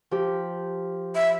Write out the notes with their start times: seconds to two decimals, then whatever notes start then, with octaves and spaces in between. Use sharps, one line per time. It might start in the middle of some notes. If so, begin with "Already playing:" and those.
0.11 F3 G4
1.15 E5